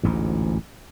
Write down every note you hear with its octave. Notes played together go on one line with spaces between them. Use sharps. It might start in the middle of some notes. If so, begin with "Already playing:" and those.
A1 D2 G#2